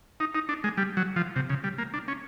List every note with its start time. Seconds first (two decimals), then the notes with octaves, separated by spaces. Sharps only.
0.20 D#4
0.35 D#4
0.49 D4
0.64 G#3
0.77 G3
0.97 F#3
1.16 F3
1.36 C3
1.49 C#3
1.64 G3
1.78 A#3
1.94 D4
2.08 C#4